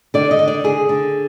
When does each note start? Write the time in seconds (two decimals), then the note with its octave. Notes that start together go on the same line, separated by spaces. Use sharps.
0.14 D3 D5
0.31 D#5
0.39 D3
0.48 D5
0.64 D3 G#4
0.89 D3